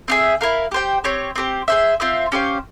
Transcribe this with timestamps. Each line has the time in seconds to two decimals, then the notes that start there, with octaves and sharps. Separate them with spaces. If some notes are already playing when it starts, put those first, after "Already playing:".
0.08 C4 F4 G#4 E5
0.41 E4 A#4 F5
0.72 G4 C5 G5
1.04 C4 G4 C#5
1.36 C4 G4 C5
1.68 G#4 C5 E5
2.00 C4 F4 C5 E5
2.32 C#4 G4 C5 F5